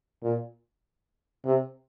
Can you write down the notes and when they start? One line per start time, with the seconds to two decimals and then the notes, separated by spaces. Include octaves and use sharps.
0.23 A#2
1.45 C3